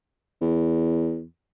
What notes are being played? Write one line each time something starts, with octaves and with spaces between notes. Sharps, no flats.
E2